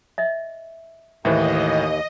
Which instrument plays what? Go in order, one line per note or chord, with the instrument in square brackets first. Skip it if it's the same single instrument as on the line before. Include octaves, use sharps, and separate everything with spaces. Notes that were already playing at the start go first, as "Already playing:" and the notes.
[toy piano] D#5 E5
[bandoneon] D#2 [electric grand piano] A2 D#3 E3 [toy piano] C5 E5 [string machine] D#5